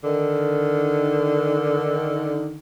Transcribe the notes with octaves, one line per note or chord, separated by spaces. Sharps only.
D3 D#3